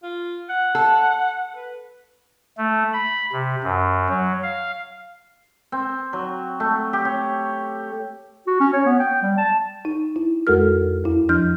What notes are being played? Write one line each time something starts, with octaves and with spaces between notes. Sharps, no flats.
F4
F#5
A4
B4
A3
B5
C3
F#2
F#3
F5
C4
F#3
A3
G4
C#5
F#4
C#4
C#5
B3
G5
G3
A5
D#4
E4
F2 G#3 F#4 A4 A#4 F6
E2 E4
F3 D4 F6 G6